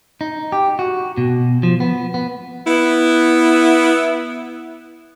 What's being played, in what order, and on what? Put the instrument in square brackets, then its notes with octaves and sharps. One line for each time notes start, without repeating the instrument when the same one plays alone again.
[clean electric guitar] D#4
G4
F#4
B2
F3
B3
B3
[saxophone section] B3 E4